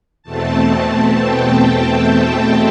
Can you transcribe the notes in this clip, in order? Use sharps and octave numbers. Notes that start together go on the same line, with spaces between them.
E2 B2 A3 C4 A5
G5
G5